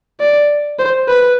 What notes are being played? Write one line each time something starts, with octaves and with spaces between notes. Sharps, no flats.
D5
C5
B4